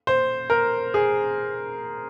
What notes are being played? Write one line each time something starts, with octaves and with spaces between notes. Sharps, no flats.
C5
A#4
G#4